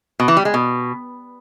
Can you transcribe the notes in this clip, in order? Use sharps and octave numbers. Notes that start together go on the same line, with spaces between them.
B2
E3
G3
G#3
B2